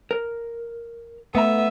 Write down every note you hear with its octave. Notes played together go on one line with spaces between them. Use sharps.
A#4
A3 B3 E5 A#5